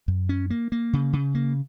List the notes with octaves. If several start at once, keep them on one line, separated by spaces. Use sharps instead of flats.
F#2
C#4
A#3
A#3
C#3
C#3
A#3